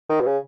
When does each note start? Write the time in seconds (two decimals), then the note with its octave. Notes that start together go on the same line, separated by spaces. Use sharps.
0.10 D#3
0.21 B2
0.26 C#3